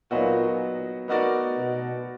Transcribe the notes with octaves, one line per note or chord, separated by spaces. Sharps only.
A#2 F#3 B3 D#4 F#4
B3 D#4 F#4 A#4 D5
B2